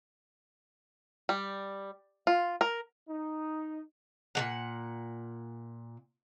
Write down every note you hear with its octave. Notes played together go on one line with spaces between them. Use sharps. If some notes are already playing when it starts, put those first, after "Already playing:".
G3
F4
A#4
D#4
A#2 G3 F#5